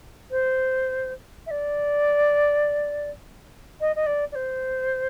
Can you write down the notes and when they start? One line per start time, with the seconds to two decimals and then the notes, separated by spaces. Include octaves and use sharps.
0.30 C5
1.46 E5
1.50 D5
3.80 D#5
3.95 D#5
4.06 D5
4.31 D5
4.35 C5